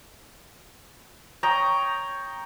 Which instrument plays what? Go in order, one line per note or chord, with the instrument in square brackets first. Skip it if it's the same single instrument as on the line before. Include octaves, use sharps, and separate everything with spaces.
[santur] C#5 G5 A#5 D#6